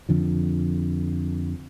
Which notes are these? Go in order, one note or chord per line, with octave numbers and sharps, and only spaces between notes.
F2 D3 F3